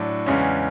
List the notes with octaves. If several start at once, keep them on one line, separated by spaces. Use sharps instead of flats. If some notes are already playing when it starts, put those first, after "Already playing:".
Already playing: A2 F#3 D4
E2 C#3 G#3 C#4